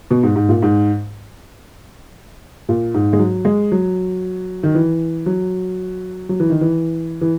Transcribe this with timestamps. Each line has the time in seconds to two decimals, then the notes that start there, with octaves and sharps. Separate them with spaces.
0.11 B2
0.23 G#2
0.36 G#2
0.49 A#2
0.62 G#2
2.69 A#2
2.94 G#2
3.13 G#3
3.19 F#3
3.45 G#3
3.72 F#3
4.63 D#3
4.75 E3
5.26 F#3
6.29 F#3
6.40 E3
6.50 D#3
6.61 E3
7.21 E3